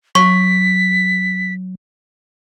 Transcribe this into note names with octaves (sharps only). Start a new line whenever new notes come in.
F#3 C#6 B6